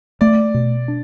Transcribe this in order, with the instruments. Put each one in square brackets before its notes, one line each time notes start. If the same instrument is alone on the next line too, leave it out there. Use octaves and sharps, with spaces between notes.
[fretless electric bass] A3 [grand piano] D5
[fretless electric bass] B2
D4